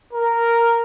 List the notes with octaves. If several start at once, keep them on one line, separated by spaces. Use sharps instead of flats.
A#4